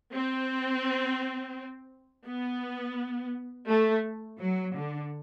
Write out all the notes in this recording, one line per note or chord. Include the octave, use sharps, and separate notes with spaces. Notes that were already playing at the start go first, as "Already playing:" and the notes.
C4
B3
A3
F#3
D3